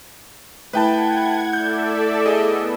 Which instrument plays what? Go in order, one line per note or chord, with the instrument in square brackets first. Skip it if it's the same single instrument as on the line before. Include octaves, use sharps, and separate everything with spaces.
[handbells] A3 E4 [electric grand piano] B4 G5 A5 [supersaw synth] F#5 G#6
[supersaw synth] A4 D5 E5 [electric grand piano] G6
[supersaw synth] B3 [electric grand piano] G#4 D#5